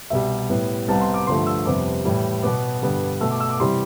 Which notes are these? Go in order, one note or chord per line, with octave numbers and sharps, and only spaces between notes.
C2 B2 G3 E5
A2 G3 B3
C2 C3 G3 B3 A5
C6
D6
G2 D3 F3 A3 C6
E6
F2 C3 G3 B3 D6
A2 E3 G3
B2 B3 D6
G2 D3 G3 B3
B2 A3 E6
D6
E6
D6
C3 E3 G3 C6